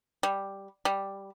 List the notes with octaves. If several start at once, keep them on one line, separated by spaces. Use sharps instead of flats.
G3
G3